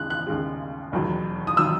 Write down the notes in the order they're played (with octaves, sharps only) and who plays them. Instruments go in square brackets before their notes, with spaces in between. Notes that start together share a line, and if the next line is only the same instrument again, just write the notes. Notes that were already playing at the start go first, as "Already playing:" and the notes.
Already playing: [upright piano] D#2 C#3 G#3 F#6
F#6
D#2 C#3 G#3
E1 D#2 D#3 F#3
D#6
D#3 F#3 E6